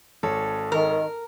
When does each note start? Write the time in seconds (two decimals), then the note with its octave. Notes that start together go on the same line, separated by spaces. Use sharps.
0.23 G#1 A4 C#5
0.72 D#3 A#4